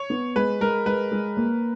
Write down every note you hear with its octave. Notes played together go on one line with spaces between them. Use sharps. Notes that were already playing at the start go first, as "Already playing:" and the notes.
Already playing: C#5
B3
G#3 B4
G#3 A#4
G#3 B4
G#3
A#3